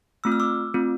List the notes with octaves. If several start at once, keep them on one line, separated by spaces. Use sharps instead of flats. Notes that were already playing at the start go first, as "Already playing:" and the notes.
A3 C4 F4 E6
F6
D6 E6
A3 C4 F4